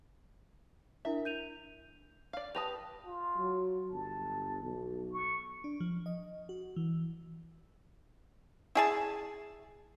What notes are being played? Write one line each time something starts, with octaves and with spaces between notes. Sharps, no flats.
D4 E4 A#4 E5
G6 D#7 F7
D5 F5
G4 B4 A5 D#6 A#6 F7
F4
F#3
G1 A5
B1
C#6
D4
F3
D#5
F#4
E3
E4 G#4 A5